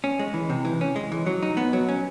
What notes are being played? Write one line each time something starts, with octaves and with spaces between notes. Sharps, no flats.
C#4
G#3
E3
C3
E3
C#4
G#3
E3
F#3
D#4
B3
F#3
C#4